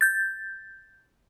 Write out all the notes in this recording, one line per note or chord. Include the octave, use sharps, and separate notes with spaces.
G6 A6